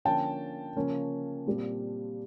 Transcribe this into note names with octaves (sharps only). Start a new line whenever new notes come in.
D3 F3 A#3 C#4 G5 A5
C#3 F3 A#3 C#4
A#2 G3 C4